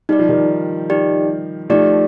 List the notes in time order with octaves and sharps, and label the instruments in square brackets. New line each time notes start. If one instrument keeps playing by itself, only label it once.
[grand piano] G3 [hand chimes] D#4 G4 D5
[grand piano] F3
D#3 G3
[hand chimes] D#4 G4 D5
[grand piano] F3 A3 [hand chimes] D#4 G4 D5